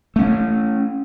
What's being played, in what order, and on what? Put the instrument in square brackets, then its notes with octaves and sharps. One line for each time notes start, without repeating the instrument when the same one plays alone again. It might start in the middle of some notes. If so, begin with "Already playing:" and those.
[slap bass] A3 C#4